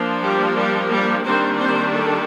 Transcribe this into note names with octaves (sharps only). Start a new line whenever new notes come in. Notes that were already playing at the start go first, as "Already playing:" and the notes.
Already playing: F3 A#3 D4
G3 G4
G3 G4
G3 G4
D#3 G3 A#3 C4 D4 C5
C4 C5
A3 A4